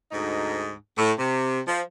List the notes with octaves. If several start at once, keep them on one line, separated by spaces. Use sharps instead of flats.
D2 G#2 D#4
A2
C3
F3